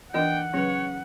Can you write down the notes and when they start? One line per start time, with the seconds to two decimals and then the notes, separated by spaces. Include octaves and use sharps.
0.14 E3 D4 D#4 A#4 D#5 F#5 G5
0.54 C#3 F#3 B4 C#5